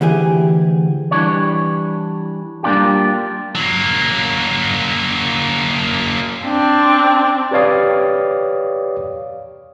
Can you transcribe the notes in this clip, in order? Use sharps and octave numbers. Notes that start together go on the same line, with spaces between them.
D2 E3 G4 G#4
E3 G3 D4 C#5
G3 A#3 D4 F4 G4
F#3 A#3
C4 D4
G4 B4 C#5 D5 F5 D#6